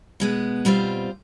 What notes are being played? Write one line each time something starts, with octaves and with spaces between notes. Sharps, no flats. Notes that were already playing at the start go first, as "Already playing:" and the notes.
B2 G#3 B3
B2 G3 C4 F4 C5